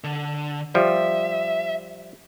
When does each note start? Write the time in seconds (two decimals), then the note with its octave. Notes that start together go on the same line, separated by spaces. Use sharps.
0.04 D3
0.75 F3 G3 E5